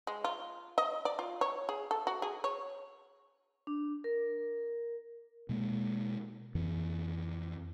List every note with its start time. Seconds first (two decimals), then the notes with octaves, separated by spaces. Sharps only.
0.07 G#3
0.24 F4
0.78 D#5
1.05 D5
1.19 F4
1.41 C#5
1.69 G#4
1.91 A4
2.07 F#4
2.22 G#4
2.44 C#5
3.67 D4
4.04 A#4
5.49 B2 G#3 A#3
6.55 F2 E3